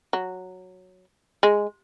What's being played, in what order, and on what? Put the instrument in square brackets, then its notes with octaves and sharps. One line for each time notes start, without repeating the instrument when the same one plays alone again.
[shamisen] F#3
G#3